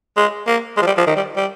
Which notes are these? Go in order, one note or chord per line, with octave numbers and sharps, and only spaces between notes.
G#3
A#3
G#3
F3
G3
F3
D#3
G3
G3